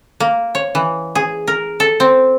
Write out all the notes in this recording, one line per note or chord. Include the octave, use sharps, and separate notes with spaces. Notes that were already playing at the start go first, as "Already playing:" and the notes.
A#3
C#5
E3
G#4
A#4
A4
C4